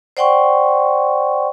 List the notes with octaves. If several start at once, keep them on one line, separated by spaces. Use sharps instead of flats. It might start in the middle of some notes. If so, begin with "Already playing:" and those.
C5 D5 F#5 G5 C6 C#6